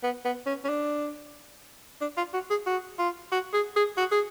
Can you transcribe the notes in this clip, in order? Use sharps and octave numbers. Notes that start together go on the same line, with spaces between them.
B3
B3
C#4
C#4
D4
D4
F4
F#4
G#4
F#4
F4
F#4
G#4
G#4
F#4
G#4